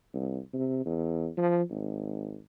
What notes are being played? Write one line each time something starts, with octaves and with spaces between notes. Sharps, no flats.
C2
C3
E2
F3
G#1